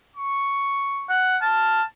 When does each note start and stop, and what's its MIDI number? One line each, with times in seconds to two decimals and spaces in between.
0.16 1.12 85
1.09 1.37 78
1.42 1.83 81
1.42 1.83 89